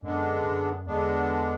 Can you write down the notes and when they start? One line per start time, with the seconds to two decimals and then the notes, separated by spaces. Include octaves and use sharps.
0.02 F#2 D3 G#3 B3 D4
0.44 F#2
0.86 E2 D3 G#3 B3 D4